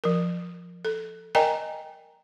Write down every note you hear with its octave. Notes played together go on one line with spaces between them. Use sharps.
F3 A#4
A4
A#4 D5 D#5 G5 G#5 A#5